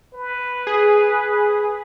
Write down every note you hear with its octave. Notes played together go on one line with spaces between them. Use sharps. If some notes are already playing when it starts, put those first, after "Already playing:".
B4
G#4